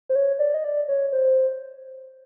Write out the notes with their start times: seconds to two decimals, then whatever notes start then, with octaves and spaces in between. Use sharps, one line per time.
0.09 C5
0.15 C#5
0.39 D5
0.54 D#5
0.64 D5
0.88 C#5
1.12 C5